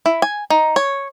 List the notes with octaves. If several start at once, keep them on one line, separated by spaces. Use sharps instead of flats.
E4
G#5
D#4
C#5